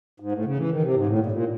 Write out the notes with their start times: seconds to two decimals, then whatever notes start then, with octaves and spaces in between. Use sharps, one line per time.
0.20 G#2
0.32 A2
0.45 C#3
0.57 E3
0.69 D#3
0.82 C3
0.94 G#2
1.07 A2
1.19 A#2
1.26 A2
1.32 A#2